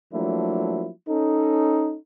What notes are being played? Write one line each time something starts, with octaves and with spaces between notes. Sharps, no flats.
F3 F#3 A3 A#3 D4 E4
C#4 D#4 A4